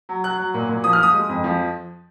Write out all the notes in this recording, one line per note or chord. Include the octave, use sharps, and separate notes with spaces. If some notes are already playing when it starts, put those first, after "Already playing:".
F#3
F#3 F#6
F#3
A#2
A#2
F3 D#6
F6
F3 D#6
G#3
F2
F3